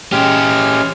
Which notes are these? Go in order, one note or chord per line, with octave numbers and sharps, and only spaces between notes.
G#3 C#4 G4 F6